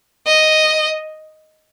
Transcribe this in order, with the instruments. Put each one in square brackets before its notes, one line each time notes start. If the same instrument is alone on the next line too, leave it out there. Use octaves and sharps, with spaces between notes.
[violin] D#5